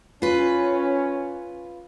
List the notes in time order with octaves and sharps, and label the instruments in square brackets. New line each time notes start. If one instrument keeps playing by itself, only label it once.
[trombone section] C#4 [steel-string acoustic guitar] F4 B4